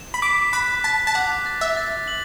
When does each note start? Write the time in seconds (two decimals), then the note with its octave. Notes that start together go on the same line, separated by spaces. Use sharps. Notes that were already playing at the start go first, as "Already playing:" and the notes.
Already playing: E7
0.14 B5
0.22 D6 B6
0.53 B5 F#6
0.84 A5 B6
1.07 A5
1.15 F#5 D6
1.46 A6
1.61 E5
1.77 A6
2.08 F#7